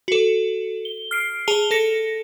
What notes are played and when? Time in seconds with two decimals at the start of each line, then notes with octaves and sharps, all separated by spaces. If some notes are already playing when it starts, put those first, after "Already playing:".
0.08 F#4 A4
0.85 G7
1.11 F6 C7 D7
1.48 G#4 A5 F7 G7
1.71 A4 A#6 C#7